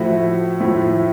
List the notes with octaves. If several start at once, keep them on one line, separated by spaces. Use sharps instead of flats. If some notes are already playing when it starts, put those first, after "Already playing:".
Already playing: A2 F3 A3 E4 F#4
A2 F3 A3